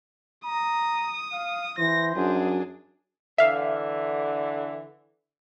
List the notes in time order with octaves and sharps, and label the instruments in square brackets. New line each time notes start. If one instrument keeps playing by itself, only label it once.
[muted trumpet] A#5 [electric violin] D#6
[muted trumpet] F5
[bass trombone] E3 [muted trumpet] C5 [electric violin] A#6
[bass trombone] F#2 [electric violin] D4 G#4
[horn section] D3 E3 [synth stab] E5 F5